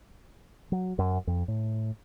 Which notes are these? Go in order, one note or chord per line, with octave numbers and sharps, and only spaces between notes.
F#3
F#2
F2
A2